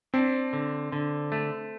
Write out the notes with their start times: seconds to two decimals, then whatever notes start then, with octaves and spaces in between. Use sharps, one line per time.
0.14 C4 D4
0.53 D3
0.92 D3
1.32 A3